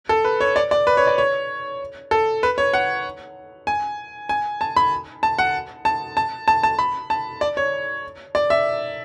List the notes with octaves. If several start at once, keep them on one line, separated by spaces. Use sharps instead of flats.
A4
B4
C#5
D5
D5
B4
C#5
D5
C#5
A4
B4
C#5
F#5
G#5
G#5
A5
B5
A5
F#5
A5
A5
A5
A5
B5
A5
D5
C#5
D5
E5